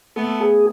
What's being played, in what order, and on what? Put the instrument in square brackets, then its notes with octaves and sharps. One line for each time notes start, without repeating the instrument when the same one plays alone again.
[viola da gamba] A3 B3 [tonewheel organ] A4
[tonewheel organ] G#4